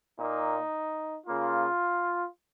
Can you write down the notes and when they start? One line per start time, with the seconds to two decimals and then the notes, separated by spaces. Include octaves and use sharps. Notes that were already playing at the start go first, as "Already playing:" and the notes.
0.17 A#2 A#3 D#4
1.27 C#3 A#3 F4